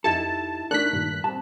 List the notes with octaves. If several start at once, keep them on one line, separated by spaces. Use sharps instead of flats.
F2 D#4 E4 G4 A4 A5
A3 D4 D#4 A4 A#4 F#6 B6
G2 A#2 D#3
G3 C4 A5